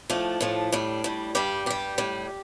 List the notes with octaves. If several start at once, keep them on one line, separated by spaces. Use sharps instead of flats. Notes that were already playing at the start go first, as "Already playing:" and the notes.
A2 F3 A3 D4
A2 F3 A3
A2 G3 D4
A2 G3
G2 G3 G4
G2 G3 G4
A2 G3